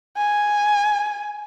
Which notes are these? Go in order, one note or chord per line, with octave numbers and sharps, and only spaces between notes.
G#5